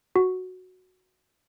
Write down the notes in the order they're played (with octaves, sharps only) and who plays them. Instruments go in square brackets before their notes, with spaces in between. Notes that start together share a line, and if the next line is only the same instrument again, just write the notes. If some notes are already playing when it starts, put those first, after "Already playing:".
[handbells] F#4